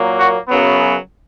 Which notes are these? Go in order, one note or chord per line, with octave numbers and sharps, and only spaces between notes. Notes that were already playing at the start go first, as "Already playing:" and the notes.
Already playing: A#2 F#3 A#3
F#4
F#2 C#3 F#3 B3